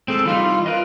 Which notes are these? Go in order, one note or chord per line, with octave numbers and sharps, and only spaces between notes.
G#3 C4 A4
E3 G3 D#4 F4
F4 A#4 B4 D#5